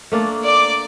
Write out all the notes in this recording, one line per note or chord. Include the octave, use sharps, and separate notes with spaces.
A3 A#3 D4
D5 D6